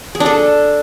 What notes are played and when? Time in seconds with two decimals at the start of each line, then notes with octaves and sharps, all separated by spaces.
0.15 G#4
0.20 D4
0.26 A4